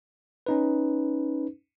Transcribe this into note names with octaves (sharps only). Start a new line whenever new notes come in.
C#4 D#4 B4